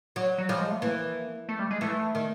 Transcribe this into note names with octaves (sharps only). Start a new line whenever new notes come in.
F#3
F#3
F3 G3
G#3
A3
E3 A#3
A3
G3
G#3
E3 A3
D#3